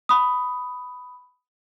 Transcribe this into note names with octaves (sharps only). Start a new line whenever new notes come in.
B5 D#6